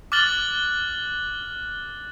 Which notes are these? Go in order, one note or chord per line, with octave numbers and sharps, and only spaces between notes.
D6 F6 F#6 A6 F#7 G7